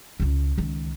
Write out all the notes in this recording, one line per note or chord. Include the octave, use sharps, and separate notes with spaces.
C#2 C#3
C#2 D#3